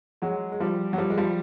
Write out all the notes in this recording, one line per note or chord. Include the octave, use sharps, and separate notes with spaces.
F#3 G#3
G#3
F3 G3
F#3
F3 G3
G#3
F3 G3